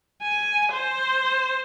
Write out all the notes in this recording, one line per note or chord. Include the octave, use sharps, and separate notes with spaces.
G#5
C5